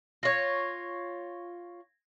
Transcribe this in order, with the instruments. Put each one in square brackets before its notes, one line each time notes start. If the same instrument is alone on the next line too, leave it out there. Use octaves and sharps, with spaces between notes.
[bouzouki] F4 C#5 [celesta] G#6 A#6